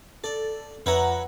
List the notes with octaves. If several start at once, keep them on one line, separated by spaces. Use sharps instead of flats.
A4 D5
F2 B4 C#5 E5 F#5 A#5